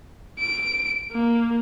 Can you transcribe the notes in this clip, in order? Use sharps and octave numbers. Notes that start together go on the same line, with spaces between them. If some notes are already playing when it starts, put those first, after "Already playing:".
D7
A#3